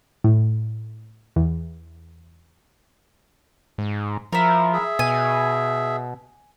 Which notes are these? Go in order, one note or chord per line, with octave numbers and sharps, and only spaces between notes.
A2
E2
G#2
F3 E4 A#4
G#4 E5
B2 G#5